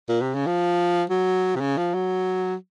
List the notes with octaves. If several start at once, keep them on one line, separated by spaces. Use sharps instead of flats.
A#2
C3
C#3
F3
F#3
C3
C#3
F3
F#3